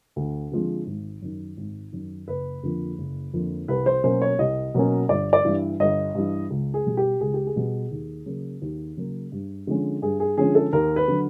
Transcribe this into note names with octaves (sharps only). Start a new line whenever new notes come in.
D2
D3 F3 G#3 C4
G#1
F#2 D#3
G#1
F#2 D#3
F#1 B4
F2 D3 F3 A#3
F#1
F2 D3 F3 A#3
C2 B4
C5
B2 F#3 A#3 C#4 C5
C#5
C2 D#5
B2 F#3 A#3 C#4
G1 D5
D5
G2 E3
G1 D#5
G2 E3
C#2
G#4
B2 G3
G4
C#2 G#4
G4
G#4
B2 G3
D#2
C#3 F#3 A#3
D#2
C#3 F#3 A#3
G2
D3 F3 G#3 C#4
G2 G#4
G#4
D3 F3 G#3 C#4 G#4
A4
D#2 A#4
B4
D3 F#3